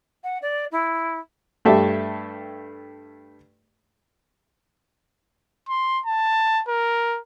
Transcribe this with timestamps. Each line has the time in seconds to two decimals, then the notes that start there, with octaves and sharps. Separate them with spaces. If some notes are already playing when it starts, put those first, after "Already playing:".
0.24 F#5
0.42 D5
0.71 E4
1.65 G2 A3 G4 A4 E5
5.69 C6
6.06 A5
6.68 A#4